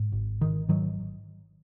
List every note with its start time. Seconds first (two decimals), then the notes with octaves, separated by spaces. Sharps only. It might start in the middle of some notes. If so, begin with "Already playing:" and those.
Already playing: G#2
0.12 G#1
0.41 G#1 D#3
0.68 G#2 D#3 F#3